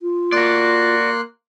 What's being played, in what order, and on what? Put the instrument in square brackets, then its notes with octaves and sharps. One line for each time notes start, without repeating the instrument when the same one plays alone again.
[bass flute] F4
[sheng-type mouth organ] A#3 C6 F#6 [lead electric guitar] F#4 D5